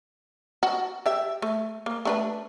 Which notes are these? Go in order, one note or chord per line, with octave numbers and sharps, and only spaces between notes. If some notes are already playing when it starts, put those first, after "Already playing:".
F#4
G4 E5
A3
A#3
A3 D4 B4